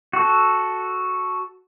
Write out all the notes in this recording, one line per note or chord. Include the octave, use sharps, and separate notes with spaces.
F#4 A4